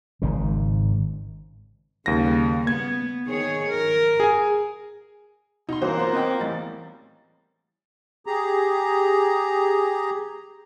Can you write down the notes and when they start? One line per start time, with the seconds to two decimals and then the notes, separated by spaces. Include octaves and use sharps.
0.22 G#1 G#2 C#3
2.06 D#2 C#3 G3 A#3 A#6
2.67 B3 G#6
3.26 D#3 G#4 C#5
3.68 A#4
4.20 G#4 G#5
5.69 B2 D#4 C6
5.82 G2 E3 A#3 C#4 F#4 C5
5.97 B3 F4
6.13 C4 D#5 G5
6.41 E2 A2 G3 A6
8.26 G4 G#4 A#5